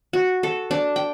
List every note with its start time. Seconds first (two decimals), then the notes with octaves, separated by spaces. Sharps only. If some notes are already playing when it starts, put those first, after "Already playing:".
0.13 F#4
0.43 A4
0.71 D4
0.96 G5